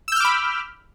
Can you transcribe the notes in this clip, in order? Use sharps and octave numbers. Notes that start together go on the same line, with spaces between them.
B5 D6 E6 F6 G6